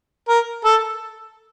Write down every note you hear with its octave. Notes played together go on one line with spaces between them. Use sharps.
A#4
A4